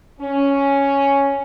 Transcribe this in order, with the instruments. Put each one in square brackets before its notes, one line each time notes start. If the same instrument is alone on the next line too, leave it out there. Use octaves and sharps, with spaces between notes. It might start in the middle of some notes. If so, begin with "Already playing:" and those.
[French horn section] C#4